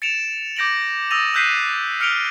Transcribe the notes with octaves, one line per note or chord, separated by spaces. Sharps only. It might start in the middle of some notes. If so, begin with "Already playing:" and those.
A6 C#7 D7 E7 F7
D6 G6 A#6 D7 F#7
D#6 E6 A6 A#6 D#7 F7
E6 F#6 G6 B6 C7 D#7
F6 C#7 D7 F7 G7